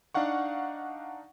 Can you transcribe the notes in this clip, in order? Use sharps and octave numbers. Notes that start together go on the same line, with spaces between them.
D4 D#4 F5 F#5 C#6